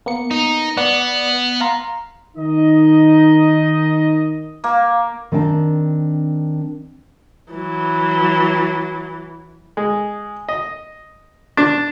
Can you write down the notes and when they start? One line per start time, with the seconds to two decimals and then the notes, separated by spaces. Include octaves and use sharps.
0.06 A#3 B3 C#7
0.31 D#4
0.77 B3 B4 D5 F#5
1.61 F5 A#5 C6
2.37 D#3 D#4 D#5
4.64 A#3
5.32 D#3 C4 D4 G5 A5
7.53 E3 F#3
9.77 G#3
10.49 D#5
11.57 D4